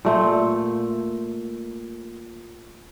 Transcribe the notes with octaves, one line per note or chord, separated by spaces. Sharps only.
A#2 A3 C5